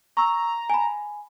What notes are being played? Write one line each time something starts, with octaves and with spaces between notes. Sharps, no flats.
A#5 C#6 E6
G#5 B5